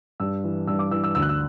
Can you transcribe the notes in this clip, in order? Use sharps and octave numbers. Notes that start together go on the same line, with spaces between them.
G2 E6
E3
G2 E6
D6
E3 E6
E6
D2 E6
F#6
E6